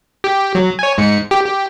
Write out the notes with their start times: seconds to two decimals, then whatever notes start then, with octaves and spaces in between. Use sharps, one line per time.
0.24 G4
0.55 F#3
0.79 C#5 G#5
0.98 G#2 C#7
1.31 G4
1.45 G4